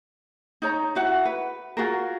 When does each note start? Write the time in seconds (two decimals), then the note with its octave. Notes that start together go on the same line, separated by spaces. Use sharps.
0.62 D#4 C#5 A#5
0.95 E4 F#4 F#5
1.25 B4
1.77 F4 F#4 G#4 A#4